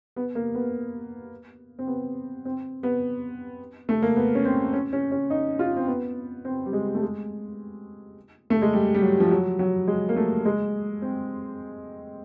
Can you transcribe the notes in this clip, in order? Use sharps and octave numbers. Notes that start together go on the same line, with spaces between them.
B3
A#3
B3
C4
B3
C4
B3
A3
A#3
B3
C#4
C4
C#4
C#4
C#4
D#4
F4
C4
B3
C4
G3
G#3
A3
G#3
A3
G#3
G3
G3
F#3
F3
F#3
F#3
G#3
A#3
A3
G#3
C4